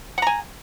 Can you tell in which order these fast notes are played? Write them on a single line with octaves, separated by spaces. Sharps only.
F#5 A#5 G#5